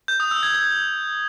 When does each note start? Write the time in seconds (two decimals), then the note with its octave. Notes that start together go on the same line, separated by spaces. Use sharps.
0.08 G6
0.20 D#6
0.31 E6
0.43 G#6
0.54 G#6